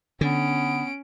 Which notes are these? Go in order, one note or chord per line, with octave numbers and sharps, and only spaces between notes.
D3 B3 C#4 D7